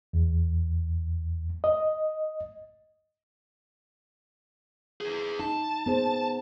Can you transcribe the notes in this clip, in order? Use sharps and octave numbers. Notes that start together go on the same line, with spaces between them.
E2
D#5
E4 G#4
D#4 A5
B3 G#4 C5